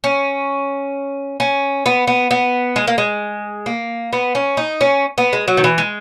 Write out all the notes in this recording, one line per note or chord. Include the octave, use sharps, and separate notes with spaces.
C#4
C#4
B3
B3
B3
G#3
A#3
G#3
A#3
B3
C#4
D#4
C#4
B3
G#3
F#3
D#3
E3
G#3